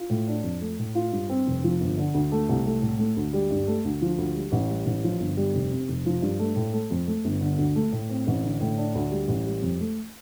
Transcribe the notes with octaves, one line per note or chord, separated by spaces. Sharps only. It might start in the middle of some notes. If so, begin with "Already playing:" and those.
Already playing: F4
A2
D4
F2
A3
A2
F4
G2
C4
F1
F3
G1
D3
D2
A3
C2
A3
A2
A3
D2
G3
G2
A3
D2
F3
D2
G3
A1
G3
A1
F3
G1
G3
F1
C3
F1
F3
G2
A3
A2
A3
F2
A3
G1
D3
D2
A3
A2
C4
A1
D3
A2
D4
D2
G3
A1
G3
F2
A3